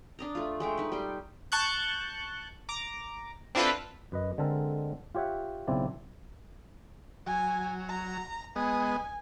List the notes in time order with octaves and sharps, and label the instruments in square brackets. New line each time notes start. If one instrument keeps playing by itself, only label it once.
[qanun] D4 D#5 A#5
A3 F4
G#3 A3 G5
D#4 B4
G3 G5 C6
[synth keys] A5 C#6 F#6 G6
A#5 D6
C4 D4 E4 F4 A4 B4
[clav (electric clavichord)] F#2 B4 D#5
D3 G#3 C4 A4 A#4
F4 G4 C#5 E5 F#5
B1 C#3 C4 E4 D5
[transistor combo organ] F#3 [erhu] G#5
[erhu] A#5
[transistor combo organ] G#3 B3 D#5 [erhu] G#5